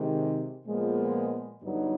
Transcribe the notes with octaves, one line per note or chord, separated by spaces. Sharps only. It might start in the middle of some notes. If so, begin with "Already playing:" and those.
Already playing: C3 D#3 G#3
A#2 F3 G#3 B3
G2 D3 F#3 B3 D#4